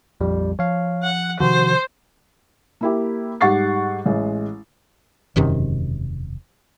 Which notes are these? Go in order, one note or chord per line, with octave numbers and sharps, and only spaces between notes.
A#1 F2 G3
F3 C#5 F5
F#5
C3 D#3 F3 F#4 C5
A#3 E4 G4
G#2 G3 F#5 C#6 A6 C7
A1 G#3
E1 F#2 C3 D#3